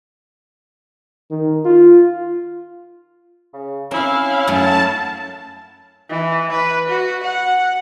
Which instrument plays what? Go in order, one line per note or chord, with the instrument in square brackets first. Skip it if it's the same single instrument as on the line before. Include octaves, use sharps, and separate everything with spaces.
[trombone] D#3
F4
[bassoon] C#3
[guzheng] C4 [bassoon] C#4 [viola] E4 F5
[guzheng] F#2 F#3 A3 [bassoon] C#4 [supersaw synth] A5
[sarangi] E3
B4
F#4
F#5